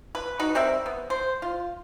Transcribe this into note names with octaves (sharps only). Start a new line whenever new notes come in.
B4
D#4 F#4 B4
G3 C4 A#4 E5
B3
C5
F4